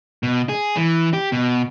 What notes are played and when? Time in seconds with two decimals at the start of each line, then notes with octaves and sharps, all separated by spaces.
0.23 B2
0.49 G#4
0.77 E3
1.13 G4
1.32 B2